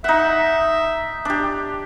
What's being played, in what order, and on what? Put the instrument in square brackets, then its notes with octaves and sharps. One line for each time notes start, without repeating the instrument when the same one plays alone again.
[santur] D#4 F#5 [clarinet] E5
[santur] D4 G4